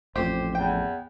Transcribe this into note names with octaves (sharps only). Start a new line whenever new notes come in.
A1 F2 A#2 G4 C5
E2 G5